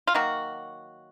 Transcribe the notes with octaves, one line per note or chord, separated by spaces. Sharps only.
F4
D#3 F#3 A#3 F#4